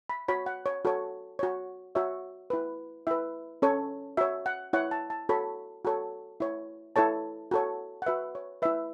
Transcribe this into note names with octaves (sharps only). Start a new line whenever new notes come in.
B5
F#4 C#5 B5
F#5
C#5
F#4 A4 C#5
F#4 C#5
F#4 C#5 E5
E4 B4
E4 B4 E5
C#4 A4 C#5
F#4 C#5 E5
F#5
E4 C#5 F#5
A5
A5
F#4 A4 C#5 B5
F#4 A4 C#5
E4 C#5
E4 A4 C#5 A5
F#4 A4 C#5
F#5
F#4 B4 E5
C#5
E4 B4 E5